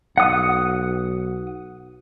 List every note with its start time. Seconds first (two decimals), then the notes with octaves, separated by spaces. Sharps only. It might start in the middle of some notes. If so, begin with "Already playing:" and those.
0.18 B1 F#5 D#6